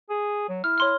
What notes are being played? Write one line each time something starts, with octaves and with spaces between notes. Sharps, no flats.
G#4
F#3
E4 F6
C#5 C6 F6